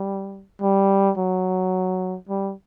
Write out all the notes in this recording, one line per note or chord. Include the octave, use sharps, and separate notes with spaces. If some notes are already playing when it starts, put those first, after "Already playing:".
Already playing: G3
G3
F#3
G3